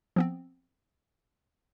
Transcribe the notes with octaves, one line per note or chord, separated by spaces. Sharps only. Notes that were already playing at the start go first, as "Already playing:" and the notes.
F3 B3 C4